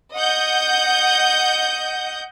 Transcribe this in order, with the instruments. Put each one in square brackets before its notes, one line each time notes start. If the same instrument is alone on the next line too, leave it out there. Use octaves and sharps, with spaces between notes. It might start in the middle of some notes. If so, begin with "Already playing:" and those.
[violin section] D#5 F#5 G6